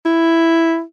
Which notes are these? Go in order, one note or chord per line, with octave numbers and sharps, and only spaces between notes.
E4